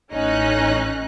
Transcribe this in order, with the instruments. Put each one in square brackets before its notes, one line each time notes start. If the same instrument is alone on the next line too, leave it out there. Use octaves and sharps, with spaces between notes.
[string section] A1 C#4 D#4 F#6